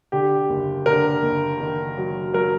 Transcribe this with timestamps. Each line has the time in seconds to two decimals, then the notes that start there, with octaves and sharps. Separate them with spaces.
0.12 D3 G4
0.49 F#1
0.86 D3 A#4
1.23 F#1
1.60 D#3
1.97 F#3
2.33 F#3 A#4